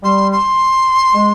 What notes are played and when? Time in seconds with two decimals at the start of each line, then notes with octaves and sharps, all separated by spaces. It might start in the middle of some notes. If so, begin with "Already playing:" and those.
0.03 G3 C6
0.32 C6
1.14 G#3